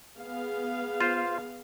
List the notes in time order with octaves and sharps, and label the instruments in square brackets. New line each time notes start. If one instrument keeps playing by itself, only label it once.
[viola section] B3 G#4 F5
[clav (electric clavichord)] F4 C5